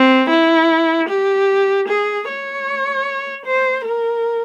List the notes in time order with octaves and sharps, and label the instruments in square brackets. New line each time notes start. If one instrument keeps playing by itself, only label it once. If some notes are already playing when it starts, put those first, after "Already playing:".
Already playing: [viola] C4
E4
G4
G#4
C#5
C5
A#4